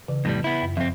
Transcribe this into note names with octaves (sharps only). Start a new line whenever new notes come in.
C#3 E3
F2 A2 G3 A#6
B3 E4
F#2
F2 C4 E5